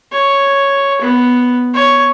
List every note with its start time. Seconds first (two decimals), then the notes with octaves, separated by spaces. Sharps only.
0.12 C#5
1.01 B3
1.74 C#5